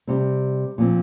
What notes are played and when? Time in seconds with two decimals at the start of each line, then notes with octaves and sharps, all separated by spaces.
0.07 C3 G3 C4
0.78 A#2 F3 C4